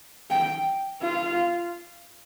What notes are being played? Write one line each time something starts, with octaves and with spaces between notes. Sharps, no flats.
G5
F4